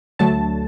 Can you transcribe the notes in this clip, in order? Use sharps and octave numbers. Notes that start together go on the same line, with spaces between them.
D2 D3 F#3 A3 A5